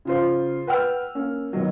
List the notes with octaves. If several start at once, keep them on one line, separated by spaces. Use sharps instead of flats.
C#3 F4 C5
B4 F#5 G5 E6 F6
A#3 C#4
B2 D#3 F#3